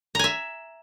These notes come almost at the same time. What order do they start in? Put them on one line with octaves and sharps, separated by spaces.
A#5 G#5 E5